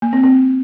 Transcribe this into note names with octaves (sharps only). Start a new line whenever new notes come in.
A#3
C4
C4